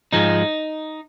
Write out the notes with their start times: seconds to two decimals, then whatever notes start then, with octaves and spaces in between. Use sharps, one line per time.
0.13 G#2 F3 G#3 D#4